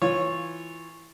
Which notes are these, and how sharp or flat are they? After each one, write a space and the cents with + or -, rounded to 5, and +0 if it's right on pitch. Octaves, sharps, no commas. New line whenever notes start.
E3 +0 F4 +0 C#5 -10